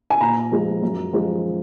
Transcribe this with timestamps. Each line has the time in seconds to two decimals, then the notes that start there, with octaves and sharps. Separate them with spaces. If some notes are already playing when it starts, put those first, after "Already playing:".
0.10 G#5
0.21 A#2 A#5
0.52 F3 G#3
0.82 F#2
1.13 F3 G#3